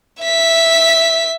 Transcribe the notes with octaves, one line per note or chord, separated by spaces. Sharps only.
E5 B6